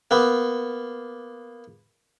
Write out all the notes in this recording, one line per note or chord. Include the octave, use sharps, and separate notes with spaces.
A#3 B3